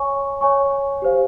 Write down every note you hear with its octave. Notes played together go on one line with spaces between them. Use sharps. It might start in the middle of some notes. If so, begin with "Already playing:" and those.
Already playing: C#5 G#5 C#6
C#5 G#5 C#6
G4 C5 F5